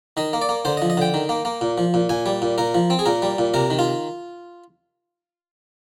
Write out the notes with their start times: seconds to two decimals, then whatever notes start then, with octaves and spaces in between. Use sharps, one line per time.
0.17 D#3 D#5
0.33 A#3
0.42 D5
0.49 A#3
0.65 D3 C5
0.77 D#5
0.82 F3
0.90 D#5
0.97 D3 G5
1.14 D#3
1.29 A#3
1.45 A#3
1.61 A#2
1.78 F3
1.94 A#2
2.09 A#2 G#5
2.26 G3
2.42 A#2
2.58 A#2 A#4
2.75 F3
2.90 C4
2.99 G#4
3.06 A#2 A#4
3.22 G3
3.38 A#2
3.54 C3 A#4
3.70 D#3
3.79 F4